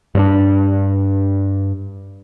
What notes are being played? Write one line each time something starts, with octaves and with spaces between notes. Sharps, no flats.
G2 C#4 D4